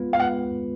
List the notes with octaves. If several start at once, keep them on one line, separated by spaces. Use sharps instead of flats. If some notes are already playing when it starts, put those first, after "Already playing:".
Already playing: G#3 B3 F4 B4
F5
G#3 B3 F4 B4 F#5